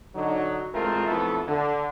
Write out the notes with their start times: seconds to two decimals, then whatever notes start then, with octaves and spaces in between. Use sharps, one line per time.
0.15 D3 F#3 D#4
0.73 A1 G#3 A3 C4 F4 A#4
1.08 B1 F2 A3 B3 E4 A4
1.48 D3